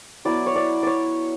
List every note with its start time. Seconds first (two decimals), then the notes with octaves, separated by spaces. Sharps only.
0.25 F#3 B3 E4 D5
0.46 C#5
0.56 D5
0.83 C#5 D5